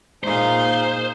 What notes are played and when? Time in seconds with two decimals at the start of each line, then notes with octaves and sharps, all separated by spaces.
0.24 A#2 D#4 G#4 C5 F5